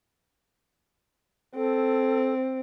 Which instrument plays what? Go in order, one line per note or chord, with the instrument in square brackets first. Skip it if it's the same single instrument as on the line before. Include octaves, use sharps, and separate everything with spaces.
[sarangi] C4 [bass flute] A4